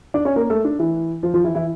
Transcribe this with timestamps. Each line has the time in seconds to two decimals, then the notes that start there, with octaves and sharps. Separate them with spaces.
0.14 D4 D5
0.25 C#4 C#5
0.36 A#3 A#4
0.50 A3 A4
0.65 D4
0.79 E3 E4
1.23 F3 F4
1.34 F3 F4
1.44 E3 E4
1.55 E3 E4